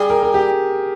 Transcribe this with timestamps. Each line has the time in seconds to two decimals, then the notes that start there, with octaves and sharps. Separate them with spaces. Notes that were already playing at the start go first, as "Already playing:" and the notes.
Already playing: G3 G#4
0.10 A#4
0.22 A#4
0.34 G4